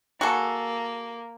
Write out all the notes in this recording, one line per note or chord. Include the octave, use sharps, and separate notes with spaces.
A#3 F#4 G#4 A4